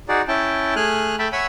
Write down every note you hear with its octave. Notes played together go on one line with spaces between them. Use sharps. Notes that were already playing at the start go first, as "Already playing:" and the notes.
D#4 F#4 G#4 D5
C#4 E4 G5 A5
A3 G#4 G#5 F6 F#6
A3 E5 G5 A5 B5
C#5 E5 F#5 G#5 B5 E6